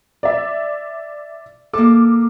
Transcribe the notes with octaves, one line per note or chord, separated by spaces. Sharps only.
D5 E5
A#3 A4 D6